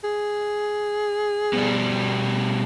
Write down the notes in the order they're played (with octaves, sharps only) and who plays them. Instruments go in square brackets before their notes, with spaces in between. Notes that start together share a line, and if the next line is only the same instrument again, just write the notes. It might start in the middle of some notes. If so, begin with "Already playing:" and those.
[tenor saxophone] G#4
[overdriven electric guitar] B2 G3